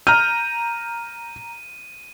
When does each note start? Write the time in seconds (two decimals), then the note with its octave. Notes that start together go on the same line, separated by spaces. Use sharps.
0.07 A#5 F6 G6 D#7